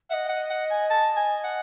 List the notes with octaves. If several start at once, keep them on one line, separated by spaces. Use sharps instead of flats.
D#5 E5 F#5
F#5
F#5
G#5
A5
G#5
F#5